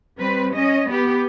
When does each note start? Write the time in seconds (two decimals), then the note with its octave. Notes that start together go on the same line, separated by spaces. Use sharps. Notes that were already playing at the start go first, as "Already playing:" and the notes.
0.17 G3 C4 B4
0.54 C#4 D#5
0.89 B3 G4